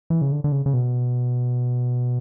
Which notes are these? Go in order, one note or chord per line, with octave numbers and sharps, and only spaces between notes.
E3
C#3
D3
D3
C#3
C#3
B2